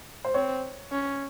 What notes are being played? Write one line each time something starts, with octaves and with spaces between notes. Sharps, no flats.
C5
C4 C#5
C#4